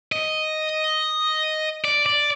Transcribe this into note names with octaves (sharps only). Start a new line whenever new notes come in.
D#5
D5
D5